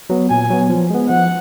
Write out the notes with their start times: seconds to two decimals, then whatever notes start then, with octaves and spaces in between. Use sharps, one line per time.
0.10 F#3 B3
0.30 A#2 G#5
0.50 F#3 B3
0.70 F3
0.90 G#3 B3
1.10 F3 F#5